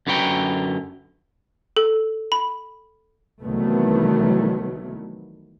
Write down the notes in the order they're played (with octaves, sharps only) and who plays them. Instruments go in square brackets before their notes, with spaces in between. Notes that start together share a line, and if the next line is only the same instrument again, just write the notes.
[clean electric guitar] F#2 D3 B4 C#5 G5 A#5
[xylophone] A4
B5
[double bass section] C2 D#3 E3 F#3 A3 B3